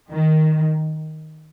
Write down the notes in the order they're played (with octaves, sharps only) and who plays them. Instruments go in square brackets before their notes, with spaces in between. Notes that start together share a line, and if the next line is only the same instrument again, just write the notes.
[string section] D#3